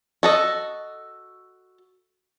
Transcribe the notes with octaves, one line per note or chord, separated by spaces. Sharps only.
F#4 A4 D#5